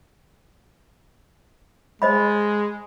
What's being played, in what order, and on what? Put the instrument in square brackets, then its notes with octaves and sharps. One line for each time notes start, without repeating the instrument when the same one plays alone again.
[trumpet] G#3 [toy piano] C5 D#5 B5